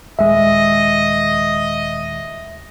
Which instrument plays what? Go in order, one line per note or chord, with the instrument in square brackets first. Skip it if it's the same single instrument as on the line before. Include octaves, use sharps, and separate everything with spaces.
[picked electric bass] D#1 G#3 [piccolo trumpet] D#5 [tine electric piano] E5